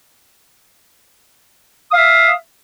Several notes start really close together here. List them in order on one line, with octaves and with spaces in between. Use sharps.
D#6 F5 E5